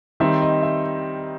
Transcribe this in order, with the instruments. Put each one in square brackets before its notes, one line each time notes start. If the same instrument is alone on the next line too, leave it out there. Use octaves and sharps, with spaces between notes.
[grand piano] D#3 G3 C4 D#4 E5
D#5
E5